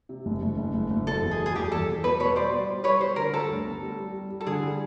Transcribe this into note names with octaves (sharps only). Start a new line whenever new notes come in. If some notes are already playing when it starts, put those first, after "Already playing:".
C3
F#1
F#1
F#1
F#1
F#1
B2 A4
E2
G#4
G3
G#4
E2 G4
E2 A4
B2
B2 B4
B2 B4 C#5
G3 C5 D5
B2
G3
G3 B4 C#5
G3 C5
D3 A#4
G3 A4
D2
B3
G3
G3
G3
G3
A4
D3 G#4
G3